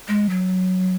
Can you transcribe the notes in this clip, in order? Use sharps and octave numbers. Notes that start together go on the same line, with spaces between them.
G#3
F#3